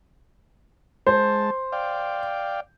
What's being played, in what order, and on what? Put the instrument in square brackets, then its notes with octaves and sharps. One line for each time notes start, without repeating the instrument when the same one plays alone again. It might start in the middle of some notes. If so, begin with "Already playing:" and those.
[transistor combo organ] G#3 A5 [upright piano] C5
[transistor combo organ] D5 F5 G5